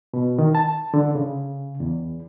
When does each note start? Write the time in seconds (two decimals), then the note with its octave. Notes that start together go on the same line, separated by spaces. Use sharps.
0.14 B2
0.39 D#3
0.55 A5
0.94 D3
1.15 C#3
1.80 E2